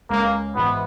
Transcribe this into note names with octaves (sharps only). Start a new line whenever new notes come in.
C#2 C#3 G#3 A#3
G#1 G#2 E3 B3